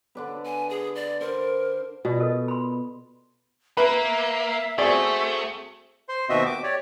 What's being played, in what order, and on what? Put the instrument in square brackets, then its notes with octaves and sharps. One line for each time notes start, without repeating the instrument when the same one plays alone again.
[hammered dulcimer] D3 D4 B4
[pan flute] G#5
G#4
D5
[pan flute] A#4 [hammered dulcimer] C5
[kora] B2 [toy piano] F4 D5
[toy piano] A4 A#4 D#5
B5 C6
[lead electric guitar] A#3 [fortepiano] B4 [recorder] E5
[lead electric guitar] A3 [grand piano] C4 F#4 G#4 [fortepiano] D5 C#6
[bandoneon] C5 C6
D#2 B2 C4 F#4 D#5 E5
D6
G4 C#5 D5